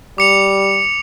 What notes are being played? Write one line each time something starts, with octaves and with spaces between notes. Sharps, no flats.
G3 D6 C#7 F7